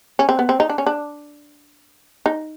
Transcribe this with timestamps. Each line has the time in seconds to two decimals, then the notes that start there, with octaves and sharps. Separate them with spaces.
0.19 C#4
0.29 C4
0.39 B3
0.49 C4
0.60 D#4
0.70 D4
0.78 C#4
0.87 D4
2.26 D#4